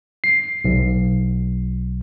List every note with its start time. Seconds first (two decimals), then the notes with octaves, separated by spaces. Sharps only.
0.24 C7
0.65 B1